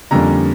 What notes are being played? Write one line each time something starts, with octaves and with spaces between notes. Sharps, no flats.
F2 D3 G3 A#3 C#4 A#5